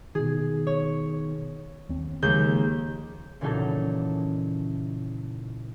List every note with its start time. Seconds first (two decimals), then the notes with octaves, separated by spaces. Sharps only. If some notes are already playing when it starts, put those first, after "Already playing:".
0.15 B2 D#3 G#4
0.67 C#5
1.89 D#2 C4
2.22 D#2 C#3 F3 G#3 A#3 G6
3.41 A#2 C#3 E3 F#3 D#4 A4